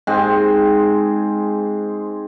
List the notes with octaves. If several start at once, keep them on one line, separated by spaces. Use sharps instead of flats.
G#2 G#3 C4